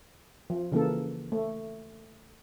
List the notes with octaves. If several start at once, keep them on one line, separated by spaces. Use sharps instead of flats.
F3
C#3 E3 A#3 A4
A3